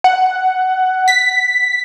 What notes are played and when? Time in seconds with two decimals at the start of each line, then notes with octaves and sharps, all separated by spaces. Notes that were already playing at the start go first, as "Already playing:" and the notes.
0.04 F#5
1.08 B6